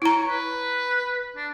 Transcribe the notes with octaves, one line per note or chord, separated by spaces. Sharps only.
E4 C#5 A#5
B4
D4